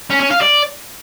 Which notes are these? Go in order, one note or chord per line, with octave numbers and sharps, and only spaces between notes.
C#4
C#4
F5
D5